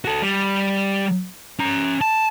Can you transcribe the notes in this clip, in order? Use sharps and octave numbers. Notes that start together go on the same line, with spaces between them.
F#4 A4
G3
C#4 A#5
A5